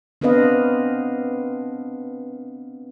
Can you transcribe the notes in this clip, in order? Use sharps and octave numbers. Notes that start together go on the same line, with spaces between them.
B3 C4 D4 B4 D#5 F5